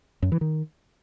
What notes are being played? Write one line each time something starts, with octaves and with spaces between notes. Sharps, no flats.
F#2
E3
D#3